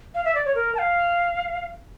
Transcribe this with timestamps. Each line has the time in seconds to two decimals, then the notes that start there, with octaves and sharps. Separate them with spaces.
0.15 F5
0.25 E5
0.35 D5
0.46 C#5
0.55 A#4
0.75 A5
0.79 F5